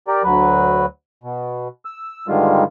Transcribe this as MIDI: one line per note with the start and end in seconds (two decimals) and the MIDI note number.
0.08 0.23 67
0.08 0.23 70
0.08 0.23 74
0.24 0.86 38
0.24 0.86 54
0.24 0.86 71
1.24 1.68 47
1.85 2.27 88
2.28 2.64 43
2.28 2.64 50
2.28 2.64 51
2.28 2.64 55
2.28 2.64 56
2.28 2.64 65